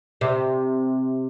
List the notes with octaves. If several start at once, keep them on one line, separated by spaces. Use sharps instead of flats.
C3